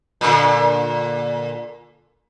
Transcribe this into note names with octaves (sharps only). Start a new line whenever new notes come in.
A#2 D3